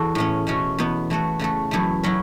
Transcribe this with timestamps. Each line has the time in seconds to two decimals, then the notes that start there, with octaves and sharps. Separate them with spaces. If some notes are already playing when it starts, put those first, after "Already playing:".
Already playing: E2 F#4 A4
0.15 A2 A3 C#4
0.47 B2 A3 C#4 F#4
0.78 E2 B2 B3
1.10 E3 A3 F#4 A4
1.40 C#3 A3 F#4 A4
1.71 F#2 E3 A3 E4 A4
2.03 F#3 C#4 E4